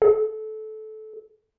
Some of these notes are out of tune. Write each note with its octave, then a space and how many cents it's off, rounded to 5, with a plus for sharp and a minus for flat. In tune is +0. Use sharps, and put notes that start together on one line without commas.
A4 -20